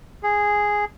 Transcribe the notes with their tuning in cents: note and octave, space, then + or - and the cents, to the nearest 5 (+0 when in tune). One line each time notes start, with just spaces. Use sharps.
G#4 -5